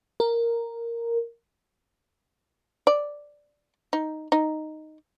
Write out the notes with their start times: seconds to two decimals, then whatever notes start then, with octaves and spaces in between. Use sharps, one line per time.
0.20 A#4
2.87 D5
3.93 D#4
4.32 D#4